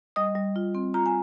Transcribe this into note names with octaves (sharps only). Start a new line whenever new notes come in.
G3 D#5 D#6
G3
F4
C4
F4 A#5
G#5